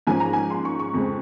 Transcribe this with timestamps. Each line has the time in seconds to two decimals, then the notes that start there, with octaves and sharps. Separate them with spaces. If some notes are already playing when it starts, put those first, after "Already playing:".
0.07 G#2 F3 A#3 C#4 G#5
0.20 A#5
0.33 G#5
0.50 C6
0.65 C#6
0.79 C#6
0.94 F2 C#3 G#3 C4